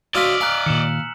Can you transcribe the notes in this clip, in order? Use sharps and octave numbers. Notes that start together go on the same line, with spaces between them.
F#3 D4 F4 D5 D#5 E6 F6 B6
F5 G#5 A#5 F#6
A#2 D#3 C#7 E7 F#7